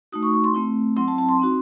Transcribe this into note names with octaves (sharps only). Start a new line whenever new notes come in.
A3 D#4 F#4 D#6
C#6
C#6
C6
A3 C4 E4
F#3 C4 E4 C6
A5
A5
C6
C4 D#4 F#4